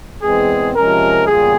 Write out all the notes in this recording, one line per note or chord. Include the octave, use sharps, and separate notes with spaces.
E2 E3 G#3 C4 G#4
C3 F3 G#3 C#4 A#4
E2 C#3 G3 A#3 F4 G#4